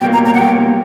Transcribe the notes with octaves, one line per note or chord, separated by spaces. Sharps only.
B2 G3 A#3 G5
A#5
A#5
F#5
B2 G3 A#3 G5